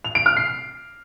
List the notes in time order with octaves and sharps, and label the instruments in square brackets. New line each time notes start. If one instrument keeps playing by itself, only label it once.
[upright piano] F7
D7
F6
C7